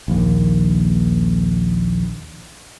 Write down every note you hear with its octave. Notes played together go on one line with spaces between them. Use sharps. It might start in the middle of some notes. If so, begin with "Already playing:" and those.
A#1 D#2